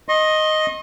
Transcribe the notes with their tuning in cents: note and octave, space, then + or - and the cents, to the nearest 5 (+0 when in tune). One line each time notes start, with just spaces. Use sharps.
D#5 +0 C6 +45